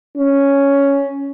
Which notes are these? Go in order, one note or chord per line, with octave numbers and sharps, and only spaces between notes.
C#4